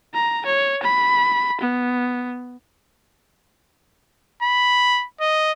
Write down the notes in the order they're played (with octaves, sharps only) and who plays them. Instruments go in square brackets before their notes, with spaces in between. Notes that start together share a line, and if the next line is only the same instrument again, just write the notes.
[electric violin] A#5
C#5
B5
B3
[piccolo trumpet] B5
D#5